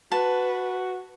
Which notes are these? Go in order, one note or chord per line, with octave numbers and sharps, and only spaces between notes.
F#4 B4 A5